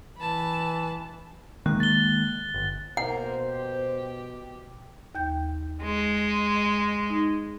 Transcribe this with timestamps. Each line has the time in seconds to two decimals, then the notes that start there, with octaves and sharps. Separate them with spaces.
0.18 E3 A5 B5
1.66 D#3 G#3 A#3 F#6
1.80 A6 G7
2.54 G1
2.97 B2 A#3 A#4 C5 F#5
3.49 G4
5.15 D#2 G5 G6
5.83 G#3
7.10 D#4